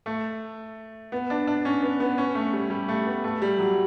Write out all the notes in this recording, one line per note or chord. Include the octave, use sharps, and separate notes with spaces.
A3
B3
D4
D4
C#4
B3
B3
C#4
A3
G3
G3
A3
B3
A3
G3
F#3